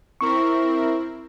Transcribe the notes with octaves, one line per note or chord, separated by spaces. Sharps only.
C4 E4 A#4 C#6